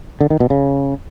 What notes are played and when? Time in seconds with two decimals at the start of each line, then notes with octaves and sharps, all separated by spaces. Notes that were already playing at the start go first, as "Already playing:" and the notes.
0.21 D3
0.30 D#3
0.40 B2
0.50 C#3